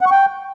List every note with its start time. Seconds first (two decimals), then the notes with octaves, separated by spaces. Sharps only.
0.01 F#5
0.06 C#6
0.11 G5